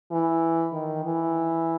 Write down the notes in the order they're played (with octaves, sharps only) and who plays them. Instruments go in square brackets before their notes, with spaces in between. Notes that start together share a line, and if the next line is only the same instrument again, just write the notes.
[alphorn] E3
D#3
E3